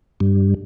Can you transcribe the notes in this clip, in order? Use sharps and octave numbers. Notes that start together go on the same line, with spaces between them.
G2